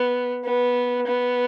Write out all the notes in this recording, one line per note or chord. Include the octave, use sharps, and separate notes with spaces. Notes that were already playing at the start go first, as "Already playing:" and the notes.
Already playing: B3
B3
B3